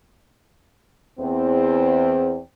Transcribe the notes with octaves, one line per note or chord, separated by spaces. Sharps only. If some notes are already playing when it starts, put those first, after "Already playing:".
E2 C4